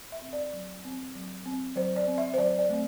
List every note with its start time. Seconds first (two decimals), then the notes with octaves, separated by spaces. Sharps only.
0.12 E5
0.22 C4
0.33 D5
0.53 F#3
0.85 C4
1.15 F#3
1.46 C4
1.76 F#3 C5
1.96 D5
2.07 C4
2.18 E5
2.34 C5
2.38 F#3 D5
2.59 D5
2.69 A3 C4